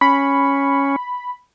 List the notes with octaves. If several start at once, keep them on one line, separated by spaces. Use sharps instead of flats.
C#4 B5